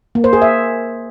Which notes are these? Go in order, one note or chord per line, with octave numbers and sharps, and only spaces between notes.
A#3
C5
G#4
E5